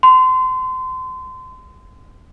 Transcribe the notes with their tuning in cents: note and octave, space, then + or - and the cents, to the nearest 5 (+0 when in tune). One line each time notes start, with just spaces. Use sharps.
C6 -30